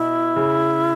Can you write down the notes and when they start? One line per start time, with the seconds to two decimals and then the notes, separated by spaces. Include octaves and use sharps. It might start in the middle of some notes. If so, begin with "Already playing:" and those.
Already playing: B2 E4
0.36 C#3